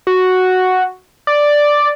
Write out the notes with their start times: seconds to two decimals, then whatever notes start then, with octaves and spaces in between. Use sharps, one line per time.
0.07 F#4
1.27 D5